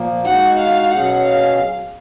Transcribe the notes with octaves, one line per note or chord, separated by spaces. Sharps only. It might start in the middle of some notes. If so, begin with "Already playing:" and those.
Already playing: A#2 F3 A#3
G#3 D#4 F#4 F#5
F5
B2 F#3 C#4 G#4 F#5
F5